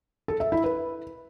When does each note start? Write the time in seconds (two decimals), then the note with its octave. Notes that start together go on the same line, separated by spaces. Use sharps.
0.28 A4
0.40 E5
0.52 E4
0.64 B4